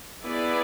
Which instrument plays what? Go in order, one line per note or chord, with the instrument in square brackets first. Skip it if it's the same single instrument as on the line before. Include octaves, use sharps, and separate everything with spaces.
[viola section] B3 E4 G#4 B4 D5